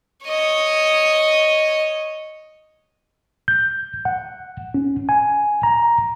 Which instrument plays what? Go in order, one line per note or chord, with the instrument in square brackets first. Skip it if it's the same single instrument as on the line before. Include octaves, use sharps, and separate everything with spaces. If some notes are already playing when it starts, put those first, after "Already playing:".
[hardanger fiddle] C#5 D#5
[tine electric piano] G6
F#5
C#4
G#5
A#5